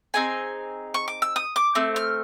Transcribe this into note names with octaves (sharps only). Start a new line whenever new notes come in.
C4 D#4 G#4 G#5
C#6
D6
E6
D#6
D6
A3 C4
F6